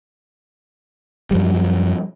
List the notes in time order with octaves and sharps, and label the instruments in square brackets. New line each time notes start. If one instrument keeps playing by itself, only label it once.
[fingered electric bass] F#2 F3 G3